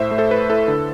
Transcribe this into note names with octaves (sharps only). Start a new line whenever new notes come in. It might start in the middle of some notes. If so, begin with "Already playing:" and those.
Already playing: A2 C5 E5
A3
A4 C5
E4 B4
E4 A4
D3